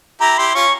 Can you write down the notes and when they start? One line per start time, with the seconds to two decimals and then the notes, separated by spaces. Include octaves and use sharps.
0.20 E4 G4 A#5
0.38 E4 G4 C6
0.55 C#4 F4 C#6